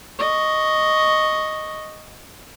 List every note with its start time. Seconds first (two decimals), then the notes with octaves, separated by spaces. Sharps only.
0.19 D#5 C#6